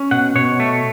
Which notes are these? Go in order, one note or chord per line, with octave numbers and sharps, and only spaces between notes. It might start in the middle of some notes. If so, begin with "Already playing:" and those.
Already playing: C#4
B2 F#5
B2 C#5
A3